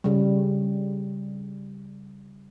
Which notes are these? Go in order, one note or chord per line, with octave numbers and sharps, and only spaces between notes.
C#3 G3